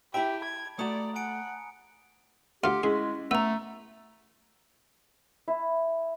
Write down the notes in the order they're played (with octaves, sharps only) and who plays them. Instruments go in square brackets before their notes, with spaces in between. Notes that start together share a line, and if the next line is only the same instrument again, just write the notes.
[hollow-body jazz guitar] E4 E5 [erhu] G4 [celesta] G5 [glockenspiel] A5 B5 D7
[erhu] G#6
[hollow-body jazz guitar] A3 F#4 [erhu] D5 [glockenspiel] A#5 D#6
[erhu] F#5 [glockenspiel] G#5 C#7 D7
[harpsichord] D2 F4 [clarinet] G4 [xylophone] F#5 C6 F6
[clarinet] G#3 [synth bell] C#4 E4 [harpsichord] G#4
[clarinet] A3 [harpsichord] B3 [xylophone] A#5 E6
[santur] E4